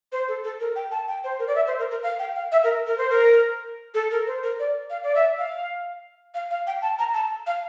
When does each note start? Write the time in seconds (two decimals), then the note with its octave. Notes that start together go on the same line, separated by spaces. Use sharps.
0.12 C5
0.28 A4
0.44 A4
0.60 A#4
0.76 G5
0.91 A5
1.08 G5
1.24 C5
1.39 A#4
1.48 D5
1.56 E5
1.67 C5
1.79 A#4
1.91 A#4
2.03 F5
2.19 G5
2.36 F5
2.52 E5
2.64 A#4
2.87 A#4
2.98 C5
3.10 A#4
3.94 A4
4.11 A#4
4.27 C5
4.43 A#4
4.59 D5
4.90 F5
5.03 D5
5.15 E5
5.38 F5
6.34 F5
6.51 F5
6.67 G5
6.82 A5
6.99 A#5
7.14 A5
7.47 F5